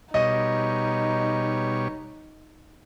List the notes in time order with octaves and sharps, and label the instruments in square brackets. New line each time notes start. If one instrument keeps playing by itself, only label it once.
[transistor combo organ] B2 G3 C#5 [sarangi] D#4 [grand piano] D#5